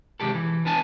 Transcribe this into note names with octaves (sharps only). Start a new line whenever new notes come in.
C3 D#3 G#3 G4 A4
E3
E2 B3 D4 G#5 A5